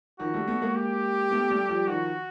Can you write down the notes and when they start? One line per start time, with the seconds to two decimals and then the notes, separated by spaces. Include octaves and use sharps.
0.19 D#3 F3 F#4
0.34 G3 A3
0.47 A3 B3
0.62 G#3 A#3
0.75 G4
1.31 A3 B3
1.50 G3 A3
1.69 F3 G3
1.87 D#3 F3 F#4